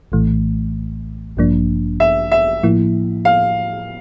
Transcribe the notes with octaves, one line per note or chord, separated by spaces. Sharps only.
A#1 A2 E3 A3
A1 G2 F3 A#3 D4
E5
E5
A2 F3 A#3 E4
F5